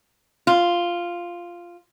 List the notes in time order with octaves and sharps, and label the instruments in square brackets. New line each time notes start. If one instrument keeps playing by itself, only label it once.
[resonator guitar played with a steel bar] F4